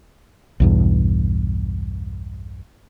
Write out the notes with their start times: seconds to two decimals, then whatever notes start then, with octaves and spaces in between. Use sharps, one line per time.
0.60 B1 E2 G2